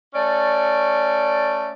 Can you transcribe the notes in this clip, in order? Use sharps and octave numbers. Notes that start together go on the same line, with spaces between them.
A3 C#4 D5